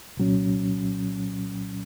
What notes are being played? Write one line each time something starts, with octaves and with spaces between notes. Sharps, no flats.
C2 A#2 F#3 C#4